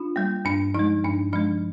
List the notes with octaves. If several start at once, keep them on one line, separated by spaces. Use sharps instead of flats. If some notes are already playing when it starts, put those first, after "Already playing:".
Already playing: D4 F4
G3 A#3
G2 D4
F3 G#3 D#4
G2 D4
F3 G#3 D4